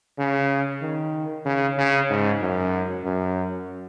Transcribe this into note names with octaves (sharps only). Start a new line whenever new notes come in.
C#3
D#3
C#3
C#3
G#2
F#2
F#2